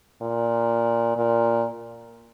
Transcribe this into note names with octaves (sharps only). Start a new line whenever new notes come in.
A#2
A#2